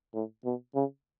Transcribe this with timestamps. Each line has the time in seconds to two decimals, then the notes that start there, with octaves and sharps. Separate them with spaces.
0.14 A2
0.44 B2
0.75 C#3